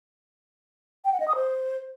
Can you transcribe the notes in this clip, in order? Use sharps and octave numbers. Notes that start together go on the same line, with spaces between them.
G5
F#5
D#5
D#6
C5